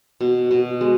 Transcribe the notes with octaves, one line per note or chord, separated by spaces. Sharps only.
B2
B2
G#3